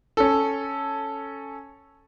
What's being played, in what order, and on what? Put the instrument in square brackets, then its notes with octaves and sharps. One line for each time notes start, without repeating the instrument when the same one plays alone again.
[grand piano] C#4 A4